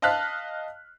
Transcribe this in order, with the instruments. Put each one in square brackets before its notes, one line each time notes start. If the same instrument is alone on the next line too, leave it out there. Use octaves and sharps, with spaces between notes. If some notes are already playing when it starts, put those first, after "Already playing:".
[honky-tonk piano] D#5 F5 A5 F6 F#6 B6